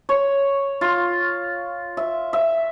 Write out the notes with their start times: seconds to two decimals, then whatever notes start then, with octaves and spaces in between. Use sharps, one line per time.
0.09 C#5
0.81 F4
1.97 E5
2.33 E5